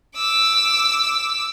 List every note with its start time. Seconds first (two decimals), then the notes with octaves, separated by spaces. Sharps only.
0.17 D6 E6